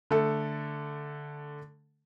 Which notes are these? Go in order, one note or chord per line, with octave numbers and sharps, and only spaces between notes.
D3 A3 A4